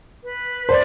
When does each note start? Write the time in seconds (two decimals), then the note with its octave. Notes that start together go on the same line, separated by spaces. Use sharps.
0.24 B4
0.69 C5 D5